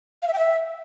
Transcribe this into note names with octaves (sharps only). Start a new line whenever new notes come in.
F5
E5
G5
E5